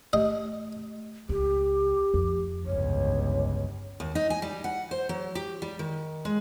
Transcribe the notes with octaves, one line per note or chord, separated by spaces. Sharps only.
A3 G4 D#5
C#2 G4
F2
G1 C#2 C#5
D#2
D#4
G#5
G3
F#5
C5
F#3
G4
G3
D#3
G#3